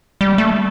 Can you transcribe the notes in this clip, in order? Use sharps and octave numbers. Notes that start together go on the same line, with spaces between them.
G3
A3